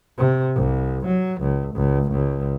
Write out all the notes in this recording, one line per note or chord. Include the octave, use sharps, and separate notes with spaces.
C3
C2
F#3
C#2
C#2
C#2